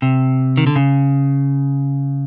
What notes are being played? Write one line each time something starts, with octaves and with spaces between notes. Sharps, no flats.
C3
D#3
D3
C#3